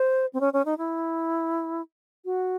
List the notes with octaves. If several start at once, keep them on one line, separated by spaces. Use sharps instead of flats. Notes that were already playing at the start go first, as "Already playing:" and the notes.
Already playing: C5
C4
C#4
C#4
D#4
E4
F#4